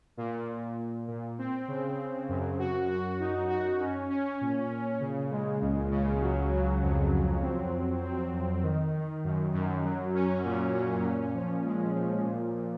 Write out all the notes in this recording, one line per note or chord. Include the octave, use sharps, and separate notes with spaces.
A#2
A#2
A#2
A#2
C4
C#3
C4
F#2
F#4
F#4
D#4
F#4
C#4
C#4
A#2
A#2
C#3
G#3
C#2
C#3
F#3
F#3
F2
F#3
C4
F2
C4
F2
D#3
D#3
F#2
F#2
F#3
C#4
A#2
C#4
A#2
F3
G#3
F3
A#2
A#2